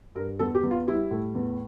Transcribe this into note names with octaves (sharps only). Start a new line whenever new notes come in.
G2 A#4
E2 A4
G4
E2
F4
G3 E4
A2
E2